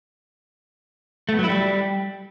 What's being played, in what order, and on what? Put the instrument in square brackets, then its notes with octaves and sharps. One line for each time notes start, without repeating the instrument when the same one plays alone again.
[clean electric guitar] A3
B3
F#3
E4
G3